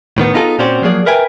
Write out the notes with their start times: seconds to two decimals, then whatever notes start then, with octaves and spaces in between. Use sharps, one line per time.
0.18 A2 D#3 B3
0.34 B3 D#4 F4 G#4 A4
0.59 A#2 C4 C#4 F#4 C5 D5
0.82 F3 F#3 A#3 G#4 D5
1.06 A#4 B4 E5 G5 G#5